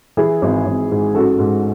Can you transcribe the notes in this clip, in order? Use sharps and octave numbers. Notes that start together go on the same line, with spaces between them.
E3 E4 G#4
G#1
G#1
G#2
A1 F#4 A4
G#2